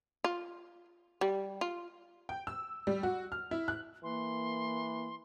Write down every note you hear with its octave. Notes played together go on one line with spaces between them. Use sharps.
F4
G3
F4
G5
E6
G3
F#4
F6
E4
F#6
E3 A#3 C6